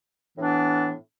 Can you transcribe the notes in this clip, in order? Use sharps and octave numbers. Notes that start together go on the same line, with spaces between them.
A2 E3 B3 D4